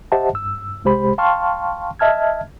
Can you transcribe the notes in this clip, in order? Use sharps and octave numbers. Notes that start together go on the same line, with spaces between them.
G4 C5 D#5 E5 F#5 A5
G2 E6
C2 C3 G#3 G4 C5 B5
F5 G5 A5 C6 C#6 F6
D#5 E5 A5 F6 G#6